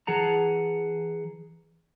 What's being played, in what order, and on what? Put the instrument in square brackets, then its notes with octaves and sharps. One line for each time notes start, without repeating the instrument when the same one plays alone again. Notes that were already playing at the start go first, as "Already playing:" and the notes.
[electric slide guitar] E3 G#4 F#5 A5 A#5